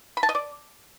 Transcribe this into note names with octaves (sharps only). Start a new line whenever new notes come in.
B5
A5
D#5
D5